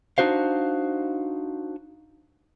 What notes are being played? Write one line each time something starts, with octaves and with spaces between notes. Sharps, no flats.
D4 D#4 F#4 C5 F5